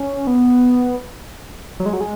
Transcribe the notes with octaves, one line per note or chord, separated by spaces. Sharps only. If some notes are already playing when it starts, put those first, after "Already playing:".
Already playing: C#4
B3
F#3
G#3
F#3
G#3